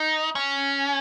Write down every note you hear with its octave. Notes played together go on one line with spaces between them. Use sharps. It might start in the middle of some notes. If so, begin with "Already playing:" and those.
Already playing: D#4
C#4